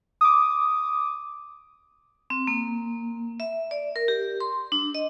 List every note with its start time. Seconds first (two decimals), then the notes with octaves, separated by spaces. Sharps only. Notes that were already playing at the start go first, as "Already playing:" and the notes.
0.21 D6 D#6
2.30 C4
2.47 A#3
3.40 E5
3.71 D5
3.96 A#4
4.08 G4
4.40 C6
4.72 D4
4.95 D#5